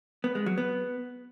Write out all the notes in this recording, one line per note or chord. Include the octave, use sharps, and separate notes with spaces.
B3
G#3
F#3
B3